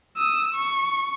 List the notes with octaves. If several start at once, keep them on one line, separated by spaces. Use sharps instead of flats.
D#6 E6
C#6